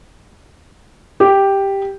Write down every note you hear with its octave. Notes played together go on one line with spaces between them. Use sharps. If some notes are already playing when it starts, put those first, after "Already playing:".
G4